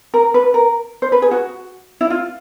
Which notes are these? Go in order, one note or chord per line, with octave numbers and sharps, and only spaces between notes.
A#4
B4
A#4
C5
B4
G#4
F#4
E4
F4